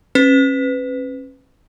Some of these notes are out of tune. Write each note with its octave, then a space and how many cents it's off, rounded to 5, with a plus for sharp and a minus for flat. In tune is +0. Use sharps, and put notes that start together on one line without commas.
C#4 -35 B4 +20